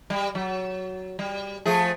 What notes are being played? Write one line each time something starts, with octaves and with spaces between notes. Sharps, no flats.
G3
F#3
G3
F3 A3 G#4